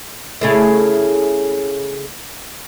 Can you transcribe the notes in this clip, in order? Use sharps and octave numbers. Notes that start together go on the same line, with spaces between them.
C#3 A3 E4